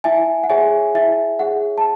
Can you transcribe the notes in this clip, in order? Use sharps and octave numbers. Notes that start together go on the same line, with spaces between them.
E4 E5 G#5
F#5
G#4 C#5 E5 G#5
E4 E5
G#4 C#5 F#5
A5